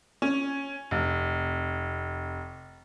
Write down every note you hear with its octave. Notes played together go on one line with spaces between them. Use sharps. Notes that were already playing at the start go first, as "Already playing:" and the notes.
C#4
F1